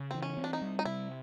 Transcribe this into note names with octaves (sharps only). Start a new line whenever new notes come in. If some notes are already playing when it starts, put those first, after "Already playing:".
Already playing: C#3
E3 C4
C#4
C4
D4
D#4
G3
D#4
C3 E4